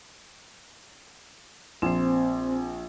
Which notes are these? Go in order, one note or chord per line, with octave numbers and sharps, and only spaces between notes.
A#1 C4 C5